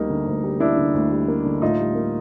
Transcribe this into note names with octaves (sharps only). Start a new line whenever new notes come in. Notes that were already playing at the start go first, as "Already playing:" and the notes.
Already playing: D2 G3 A#3 D#4
D3
D2
G3
A#3 D4 E4
D3
D2
G3
A#3
D3
A2 D#4 F4
G3
A#3